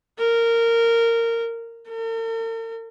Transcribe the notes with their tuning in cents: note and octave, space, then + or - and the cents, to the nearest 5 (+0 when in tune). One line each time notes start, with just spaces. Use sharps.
A#4 -15
A#4 -45